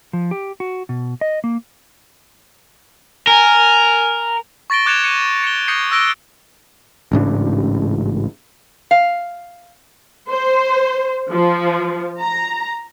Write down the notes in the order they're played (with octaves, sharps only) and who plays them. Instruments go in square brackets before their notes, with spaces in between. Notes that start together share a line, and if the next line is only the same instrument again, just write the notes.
[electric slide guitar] F3
G4
F#4
B2
D#5
A#3
[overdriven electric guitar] A#4 [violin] G#5
[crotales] C#6 A6 A#6 D7 G7
D6 F#6 G#6 C#7 E7 F7
C#7 D#7
C#7 E7 G7
D#6 G6 G#6 A#6 C7 C#7
E6 F#6 A#6 D7 G7
[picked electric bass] A1 G#2 C#3 D4
[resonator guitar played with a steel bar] F5
[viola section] C5
F3
A#5